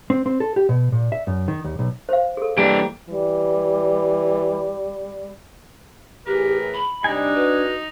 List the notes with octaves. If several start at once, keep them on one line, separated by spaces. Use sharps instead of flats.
C4
C4
A4
G4
B2
A#2
E5
F#2
D#3
D#2
B1
C5 F5
G#4 A4
E3 G3 A#3 D4 G4
E3 G3
A2 E3 G4 G#4 A#4 B4
B5
C3 G3 D4 D#4 G#5
F#4 B4